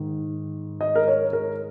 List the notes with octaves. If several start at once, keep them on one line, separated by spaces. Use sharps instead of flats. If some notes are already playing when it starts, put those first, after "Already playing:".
Already playing: G#2 D#3
D#5
A#4
C#5
A#4